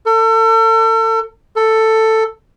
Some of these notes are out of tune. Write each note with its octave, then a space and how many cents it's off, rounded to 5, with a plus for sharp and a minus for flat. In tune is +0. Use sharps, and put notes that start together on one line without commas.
A4 +35
A4 +10